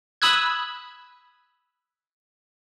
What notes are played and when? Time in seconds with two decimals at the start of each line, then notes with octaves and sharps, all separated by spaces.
0.22 B5 D#6 E6 F#6 G#6